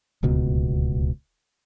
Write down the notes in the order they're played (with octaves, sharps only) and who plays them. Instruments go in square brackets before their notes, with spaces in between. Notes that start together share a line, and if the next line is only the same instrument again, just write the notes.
[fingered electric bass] D1 C#2 B2 B3